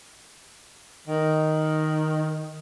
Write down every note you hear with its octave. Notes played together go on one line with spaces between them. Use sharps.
D#3